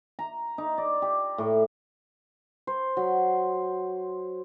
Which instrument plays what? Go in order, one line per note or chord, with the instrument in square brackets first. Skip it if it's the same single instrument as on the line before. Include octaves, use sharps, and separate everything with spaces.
[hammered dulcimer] A#5
D#4
D5
G4
A2
C5
F#3